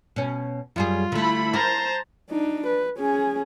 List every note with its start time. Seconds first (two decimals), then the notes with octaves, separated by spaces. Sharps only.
0.16 B2 C#4
0.76 F#2 G3 F4 G#4
1.12 D3 A3 E4 B5
1.54 A#4 C5 A5 A#5
2.30 D4 D#4
2.66 B4
2.98 C#4 G#4